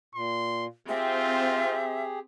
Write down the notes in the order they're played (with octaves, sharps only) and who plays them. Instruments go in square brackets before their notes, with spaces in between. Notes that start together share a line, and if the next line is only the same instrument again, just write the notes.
[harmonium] A#2 [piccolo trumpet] C6
[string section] C4 [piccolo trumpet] F4 [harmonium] G4 G#4 [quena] E5